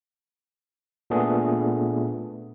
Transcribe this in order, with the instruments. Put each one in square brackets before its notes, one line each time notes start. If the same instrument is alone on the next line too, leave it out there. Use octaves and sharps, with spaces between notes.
[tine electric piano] A#2 A3 B3 D4 G#4